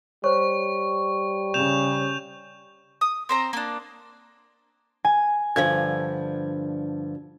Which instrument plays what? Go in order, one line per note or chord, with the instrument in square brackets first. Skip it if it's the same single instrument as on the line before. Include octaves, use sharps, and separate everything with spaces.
[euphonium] G3 [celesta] C5 C#5 [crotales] C#6
[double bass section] C#3 [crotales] G6 E7 F7
[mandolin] D#6
C4 C5 A#5
A#3 D4
[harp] G#5
[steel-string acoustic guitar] G2 D3 F3 [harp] G#6